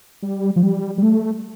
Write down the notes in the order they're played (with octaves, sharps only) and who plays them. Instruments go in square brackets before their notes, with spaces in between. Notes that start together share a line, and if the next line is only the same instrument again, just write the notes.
[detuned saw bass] G3
F3
G3
G3
A3